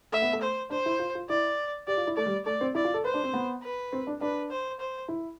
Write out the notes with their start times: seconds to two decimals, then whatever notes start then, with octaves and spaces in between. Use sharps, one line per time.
0.12 A3 E5
0.22 B3
0.33 A3
0.41 C5
0.70 D4 C5
0.86 E4
0.99 F4
1.15 F4
1.29 E4 D5
1.87 G4 D5
1.97 F4
2.07 E4
2.16 A3 D5
2.26 G3
2.45 A3 D5
2.61 C4
2.75 E4 D5
2.84 F4
2.94 A4
3.04 B4 C5
3.14 D4
3.23 C4
3.34 B3
3.62 B4
3.92 C4
4.07 D4
4.21 D4 B4
4.51 C5
4.80 C5
5.08 E4